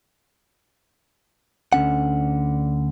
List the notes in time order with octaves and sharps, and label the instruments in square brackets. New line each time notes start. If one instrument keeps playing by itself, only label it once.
[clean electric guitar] D2 D3 C#4 F#5